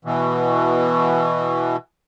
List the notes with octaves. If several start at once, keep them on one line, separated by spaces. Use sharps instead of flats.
B2 E3